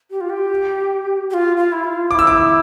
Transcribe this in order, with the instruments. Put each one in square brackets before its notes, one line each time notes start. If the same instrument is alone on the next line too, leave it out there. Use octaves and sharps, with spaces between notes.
[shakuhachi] G4
F4
G4
G4
F4
F4
E4
F4
[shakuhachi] F4 [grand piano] D6
[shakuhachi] E4 [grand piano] E6
[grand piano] D6